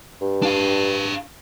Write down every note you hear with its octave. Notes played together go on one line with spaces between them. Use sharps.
G2
D4 F5